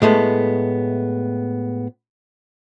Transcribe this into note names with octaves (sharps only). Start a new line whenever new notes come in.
A2 G#3 A3 B3